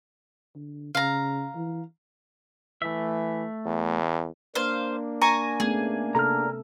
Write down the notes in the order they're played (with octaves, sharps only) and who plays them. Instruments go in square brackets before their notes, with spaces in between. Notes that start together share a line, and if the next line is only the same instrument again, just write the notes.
[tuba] D3
[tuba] C#3 [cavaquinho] F5 A#5
[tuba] E3
[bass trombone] E3 [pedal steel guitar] A3 E5
[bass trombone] E2
[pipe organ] A#3 D4 [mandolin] C5 F5
[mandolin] G#5 A#5 C#6
[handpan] A3 B3 C#4 [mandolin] G#4
[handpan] C3 A4 [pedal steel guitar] A#5 F6